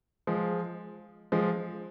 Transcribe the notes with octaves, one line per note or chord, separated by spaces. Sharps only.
F3 G#3
F3 G#3